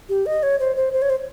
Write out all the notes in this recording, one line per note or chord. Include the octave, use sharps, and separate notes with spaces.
G4
D#5
C#5
C5
C5
C5
C#5
C5